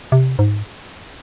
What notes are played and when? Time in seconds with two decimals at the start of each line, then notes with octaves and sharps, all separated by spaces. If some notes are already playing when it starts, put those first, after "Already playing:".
0.12 C3
0.39 G#2